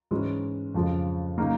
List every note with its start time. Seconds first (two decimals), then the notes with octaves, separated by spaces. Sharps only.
0.11 G#2 E3 G#3 C#4
0.74 F2 C#3 F3 G#3
1.38 C#3 F#3 A#3 D#4